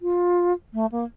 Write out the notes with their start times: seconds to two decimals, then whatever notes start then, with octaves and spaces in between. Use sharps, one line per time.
0.02 F4
0.74 A3
0.92 A#3